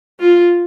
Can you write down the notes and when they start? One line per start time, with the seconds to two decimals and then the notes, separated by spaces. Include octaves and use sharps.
0.20 F4